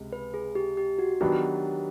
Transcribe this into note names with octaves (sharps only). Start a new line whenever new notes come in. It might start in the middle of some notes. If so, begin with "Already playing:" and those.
Already playing: C#2 C3
B4
G#4
G4
G4
F#4
D#3 F#3 B3 D4 G4